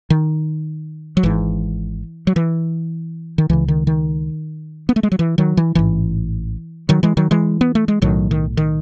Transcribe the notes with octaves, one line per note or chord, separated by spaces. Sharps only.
D#3
F#3
G#1 G#2 E3
F#3
E3
D#3
C#2 C#3 E3
D#3
D#3
B3
A3
G#3
F#3
E3
D#3 F#3
E3
A1 G#2 E3
D#3 F#3
E3 G#3
D#3 F#3
E3 G#3
B3
A3
G#3
B1 A2 D#3 F#3
D#3
D#3